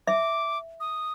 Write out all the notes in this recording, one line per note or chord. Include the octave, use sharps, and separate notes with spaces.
E5 D6
D#6